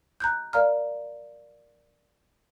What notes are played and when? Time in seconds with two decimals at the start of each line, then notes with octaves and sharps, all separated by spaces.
0.20 A#5 F#6 G6
0.53 A#4 D5 F5 A#5 F6